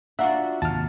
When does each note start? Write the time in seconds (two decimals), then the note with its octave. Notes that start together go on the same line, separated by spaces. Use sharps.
0.19 D4 F4 F#4 E5 F#5 A#5
0.62 D#2 G#2 C3 A5 F6